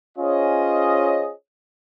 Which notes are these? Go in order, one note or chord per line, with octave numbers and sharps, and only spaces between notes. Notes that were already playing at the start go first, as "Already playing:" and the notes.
C#4 F4 G#4 C5 C#5 D#5